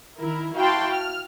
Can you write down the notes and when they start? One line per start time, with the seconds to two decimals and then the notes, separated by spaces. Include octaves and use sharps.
0.19 D#3 E4 A#4
0.57 E4 F#4 F5 G5 A5 C6
0.93 F6